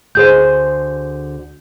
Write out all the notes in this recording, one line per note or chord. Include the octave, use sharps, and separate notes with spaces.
D2 G#4 C5 G6